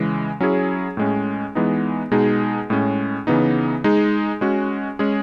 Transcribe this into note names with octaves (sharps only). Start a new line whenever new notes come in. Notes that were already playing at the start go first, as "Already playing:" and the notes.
Already playing: C#3 E3 G#3
F#3 C#4 E4 G#4
A2 G#3 C#4
E3 G#3 B3 D#4
B2 G#3 D#4 G#4
A2 G#3 C#4
C#3 E3 B3 D#4
G#3 D#4 G#4
G#3 C#4 F#4
G#3 C#4 G#4